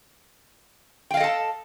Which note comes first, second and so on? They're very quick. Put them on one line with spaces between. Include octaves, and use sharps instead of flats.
G5 F5 D#5 A4 A5